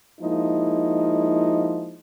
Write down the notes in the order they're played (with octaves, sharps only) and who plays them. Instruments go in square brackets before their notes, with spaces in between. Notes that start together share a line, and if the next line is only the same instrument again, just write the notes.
[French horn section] F3 G#3 A#3 D#4 E4